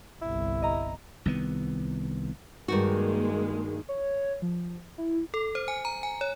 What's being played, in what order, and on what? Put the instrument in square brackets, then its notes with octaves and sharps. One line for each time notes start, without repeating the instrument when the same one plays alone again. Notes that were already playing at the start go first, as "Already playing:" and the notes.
[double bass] G1 C2 [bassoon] E4
[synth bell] D#5 A#5
[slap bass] C2 D#3 B3
[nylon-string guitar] G2 D#3 F#4 [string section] G#3 A#3
[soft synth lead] C#5
F3
E4
[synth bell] A4
C5
G#5
A#5
G#5
C#5